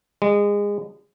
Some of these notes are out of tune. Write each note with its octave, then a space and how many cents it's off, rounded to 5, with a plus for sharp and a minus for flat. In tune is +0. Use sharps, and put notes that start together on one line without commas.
G#3 -25